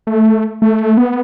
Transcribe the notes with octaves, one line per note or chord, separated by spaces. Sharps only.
A3
A3
B3